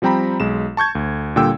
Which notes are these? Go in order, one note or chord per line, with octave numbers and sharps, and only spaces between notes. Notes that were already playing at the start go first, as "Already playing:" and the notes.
F3 G3 C4 G5 A#5 B5
B1 G#3 E7
A5 C#6 G6 G#6
D2
A#2 D3 G3 G5 E6